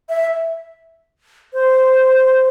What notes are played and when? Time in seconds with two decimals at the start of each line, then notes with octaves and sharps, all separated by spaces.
0.09 E5
1.53 C5